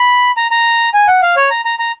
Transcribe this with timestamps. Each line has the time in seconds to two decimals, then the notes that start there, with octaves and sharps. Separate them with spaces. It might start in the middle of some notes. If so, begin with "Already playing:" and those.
Already playing: B5
0.37 A#5
0.51 A#5
0.94 G#5
1.08 F#5
1.22 F5
1.37 C#5
1.51 A#5
1.65 A#5
1.79 A#5